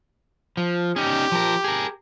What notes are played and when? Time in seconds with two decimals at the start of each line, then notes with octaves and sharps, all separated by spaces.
0.57 F3
0.96 C#4 D#4 G4
1.32 F3 A#4
1.64 G#4 A#4